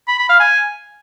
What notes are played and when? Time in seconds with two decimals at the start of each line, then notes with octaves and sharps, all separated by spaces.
0.08 B5
0.19 B5
0.29 F5
0.40 G#5